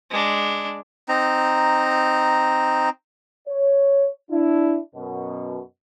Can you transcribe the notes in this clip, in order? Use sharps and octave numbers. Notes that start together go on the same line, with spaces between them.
G#3 D4
C4 D#4 A#5
C#5
D4 E4
F#2 B2